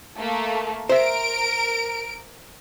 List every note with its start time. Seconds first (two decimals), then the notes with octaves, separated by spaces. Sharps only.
0.17 A3 A#3 A4
0.89 A#4 C5 E5 D7